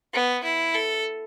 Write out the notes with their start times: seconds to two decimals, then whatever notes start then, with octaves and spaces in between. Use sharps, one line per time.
0.13 B3
0.44 E4
0.75 A4